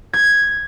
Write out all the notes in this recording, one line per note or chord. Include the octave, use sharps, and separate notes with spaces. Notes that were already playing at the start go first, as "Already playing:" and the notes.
G#6